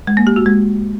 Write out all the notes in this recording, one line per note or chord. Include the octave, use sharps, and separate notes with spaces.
G#3
A#3
G4
F#4
G#3